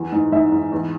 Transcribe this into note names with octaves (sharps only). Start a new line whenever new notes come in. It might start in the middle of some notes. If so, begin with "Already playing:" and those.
Already playing: E2 E3
G#2
G#2 E5
G#2
E2